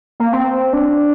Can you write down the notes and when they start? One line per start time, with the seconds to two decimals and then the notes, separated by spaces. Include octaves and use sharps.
0.20 A#3
0.33 C4
0.73 D4